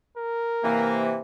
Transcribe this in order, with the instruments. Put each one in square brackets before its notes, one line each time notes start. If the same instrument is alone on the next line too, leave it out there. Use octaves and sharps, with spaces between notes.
[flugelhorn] A#4
[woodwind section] C3 E3 A#3